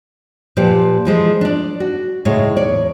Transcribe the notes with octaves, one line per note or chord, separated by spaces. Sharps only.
A#2 F3 G4 B4 D5
E3 F3 G#3
D4 D5
F#4
D2 A2 C#3 G#3 C#5
E2 C#5 D5